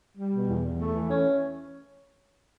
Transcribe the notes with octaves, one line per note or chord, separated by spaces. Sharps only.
G3
B2
E2
E2
A3
E3
C#4